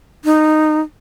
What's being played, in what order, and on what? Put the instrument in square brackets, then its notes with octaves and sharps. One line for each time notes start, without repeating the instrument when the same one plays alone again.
[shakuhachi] D#4